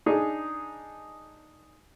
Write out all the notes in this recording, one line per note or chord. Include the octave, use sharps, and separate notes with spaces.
D4 D#4 G#4